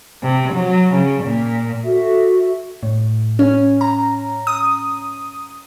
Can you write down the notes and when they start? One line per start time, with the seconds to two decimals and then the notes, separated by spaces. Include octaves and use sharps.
0.23 C3
0.54 F#3
0.94 C#3
1.24 A#2
1.84 F#4 A4 E5
2.83 A2
3.39 C#4
3.81 A#5
4.47 D#6